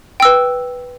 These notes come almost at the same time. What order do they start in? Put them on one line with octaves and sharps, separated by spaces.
G5 E6 B4